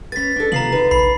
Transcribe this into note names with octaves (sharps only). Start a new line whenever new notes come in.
C#4 B4 A6 B6
D4 A4
C3 B3 F4 A#5 C7 F#7
D3 D#4 B4
A#1 B5 C7